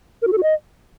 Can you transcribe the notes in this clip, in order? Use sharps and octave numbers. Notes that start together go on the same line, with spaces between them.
A#4
F#4
A4
F#4
D#5